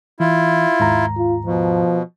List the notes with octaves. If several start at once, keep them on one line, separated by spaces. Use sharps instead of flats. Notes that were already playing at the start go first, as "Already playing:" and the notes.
E3 E4 F4
D#2 G#2 A#5
F4
B2 F3